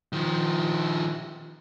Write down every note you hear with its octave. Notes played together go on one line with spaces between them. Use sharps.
D#3 F3